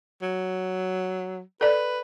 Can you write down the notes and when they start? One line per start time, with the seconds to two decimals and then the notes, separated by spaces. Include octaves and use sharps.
0.22 F#3
1.61 A4 B4 D5